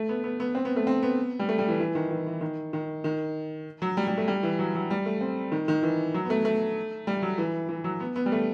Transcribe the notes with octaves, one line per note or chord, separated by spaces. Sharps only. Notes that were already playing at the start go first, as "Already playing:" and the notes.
Already playing: A3
B3
B3
B3
C4
B3
A3
C4
B3
G3
A3
G3
E3
E3
D#3
E3
E3
D#3
D#3
D#3
F#3
G3
G3
A3
G3
E3
F#3
F#3
G3
A3
C4
D#3
D#3
E3
F#3
B3
A3
A3
G3
F#3
E3
E3
F#3
B3
B3
G3
A3